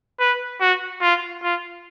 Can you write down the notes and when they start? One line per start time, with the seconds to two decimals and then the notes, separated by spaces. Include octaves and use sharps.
0.20 B4
0.60 F#4
1.02 F4
1.43 F4